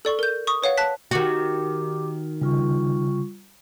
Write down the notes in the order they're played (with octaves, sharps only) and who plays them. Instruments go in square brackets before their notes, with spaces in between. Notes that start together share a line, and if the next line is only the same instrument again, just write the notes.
[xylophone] A4 D5 C#6
A#4 G6
C#6 D#6
B4 C#5 F5 F#5
A5 F#6 B6
[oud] D#3 F#4 [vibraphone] G4 D6
[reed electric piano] C#3 [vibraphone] G3 F4 C#6